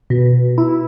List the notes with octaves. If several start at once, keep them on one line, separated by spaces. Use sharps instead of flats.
B2
E4